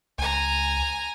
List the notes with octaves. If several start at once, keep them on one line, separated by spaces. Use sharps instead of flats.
C#2 G#5 A#5